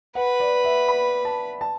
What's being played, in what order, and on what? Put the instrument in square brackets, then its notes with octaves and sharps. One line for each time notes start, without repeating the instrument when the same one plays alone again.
[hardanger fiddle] B4 [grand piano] F#5
[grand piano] D5
E5
B5
A5
A5